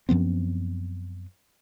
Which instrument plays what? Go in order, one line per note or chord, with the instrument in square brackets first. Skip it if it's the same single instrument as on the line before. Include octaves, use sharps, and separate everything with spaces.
[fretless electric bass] F#2 F3 B3 C4